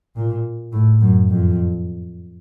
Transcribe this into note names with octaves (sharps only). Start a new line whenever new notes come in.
A#2
A2
F#2
F2